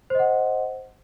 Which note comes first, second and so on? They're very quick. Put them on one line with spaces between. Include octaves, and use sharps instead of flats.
C5 D#5 F#5